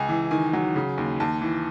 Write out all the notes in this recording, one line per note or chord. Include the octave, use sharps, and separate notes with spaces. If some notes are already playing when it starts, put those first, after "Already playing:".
Already playing: C#2 G#5
E3
D#3 G#5
F#3
C#3
D#2
D#2 A5
E3